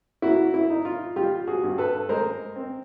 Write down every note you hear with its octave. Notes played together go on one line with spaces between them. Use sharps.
A#3 E4 F#4
E4
D#4
F4
G3 F4 G4
F#4 G#4
G2
A4 B4
G#3 A#4 C5
C4